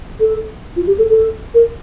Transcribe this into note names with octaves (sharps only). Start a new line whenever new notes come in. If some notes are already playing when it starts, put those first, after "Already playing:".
A4
F4
G4
A4
A4
A#4